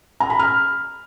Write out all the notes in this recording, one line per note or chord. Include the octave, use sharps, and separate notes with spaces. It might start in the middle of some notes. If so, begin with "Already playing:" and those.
A#5
B5
F6